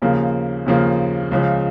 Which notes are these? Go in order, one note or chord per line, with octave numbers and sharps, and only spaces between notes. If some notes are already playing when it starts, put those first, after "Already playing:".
D#2 C#3 F3 A#3
D#2 C#3 F3 A#3
C#2 C#3 F3